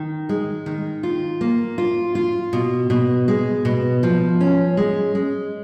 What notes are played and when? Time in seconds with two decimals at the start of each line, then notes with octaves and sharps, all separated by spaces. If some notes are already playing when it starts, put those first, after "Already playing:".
Already playing: D#3
0.29 G#3
0.66 D#3
1.03 F4
1.41 A#3
1.78 F4
2.15 F4
2.53 B2
2.90 B2
3.28 G#3
3.65 B2
4.03 F3
4.41 C#4
4.77 G#3
5.15 G#3